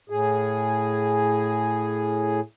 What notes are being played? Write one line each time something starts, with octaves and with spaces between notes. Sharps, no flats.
A2 G#4